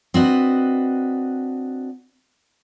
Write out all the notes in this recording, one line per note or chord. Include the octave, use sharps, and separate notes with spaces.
C4 D4 F#4 B4 D#5